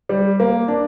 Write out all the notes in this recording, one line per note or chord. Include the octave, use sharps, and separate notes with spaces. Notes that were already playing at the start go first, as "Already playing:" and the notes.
G3
A#3
D4